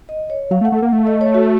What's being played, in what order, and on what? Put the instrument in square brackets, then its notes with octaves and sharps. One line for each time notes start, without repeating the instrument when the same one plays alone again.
[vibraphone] D#5
C#5
[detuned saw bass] F#3 [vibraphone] F5
[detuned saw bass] A3
[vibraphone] F#5
[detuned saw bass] A3
[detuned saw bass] A#3 [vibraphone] F#5
[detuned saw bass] A3 [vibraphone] F5
[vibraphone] D#5
C#5
F#4